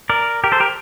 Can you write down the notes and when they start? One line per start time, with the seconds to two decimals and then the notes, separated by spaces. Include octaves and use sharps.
0.09 A#4 D5
0.44 G4 A#4
0.52 A4 C5
0.60 G4 A#4